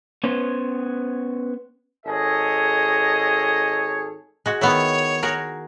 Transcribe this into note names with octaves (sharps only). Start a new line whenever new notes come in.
B3 C#4 C5 C#5
G#1 G#4 A4 C#5 D#5
G#3 F#4
D#3 B3 E4 C#5
F#4 G#4 A#4